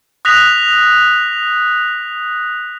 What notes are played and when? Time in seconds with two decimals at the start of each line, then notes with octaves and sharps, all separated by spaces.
0.25 D#6 F#6 A#6 B6 F7